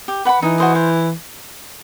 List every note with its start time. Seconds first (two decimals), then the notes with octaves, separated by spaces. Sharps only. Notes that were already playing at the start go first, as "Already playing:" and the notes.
0.08 G4
0.25 B4 F#5 B5
0.42 E3 D#4
0.58 F#4 C5 D#5
0.75 C5